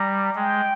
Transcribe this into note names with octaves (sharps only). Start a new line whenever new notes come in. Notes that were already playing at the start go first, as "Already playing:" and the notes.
Already playing: G3 A#5
G#3 G5